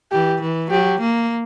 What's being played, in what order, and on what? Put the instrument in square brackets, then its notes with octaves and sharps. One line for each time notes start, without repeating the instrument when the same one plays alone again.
[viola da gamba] E3 [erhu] G4
[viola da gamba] E3
[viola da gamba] F#3 [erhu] G4
[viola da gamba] A#3